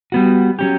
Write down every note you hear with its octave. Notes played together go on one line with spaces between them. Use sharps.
G3 B3 F#4
F#3 C#4 G4